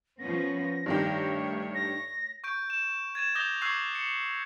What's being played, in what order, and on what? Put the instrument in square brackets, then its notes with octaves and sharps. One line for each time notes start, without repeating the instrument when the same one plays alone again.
[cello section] F3 B3 C#4 [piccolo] A#6
[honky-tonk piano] G2 D#3 G4 [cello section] A3 C#5
[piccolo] A#6
[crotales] C#6 G6 D7
E7
G#6 A6 D#7 E7
D6 D#6 G6 A#6 G7
C#6 D6 E6 F#6 G#6 C7
C#7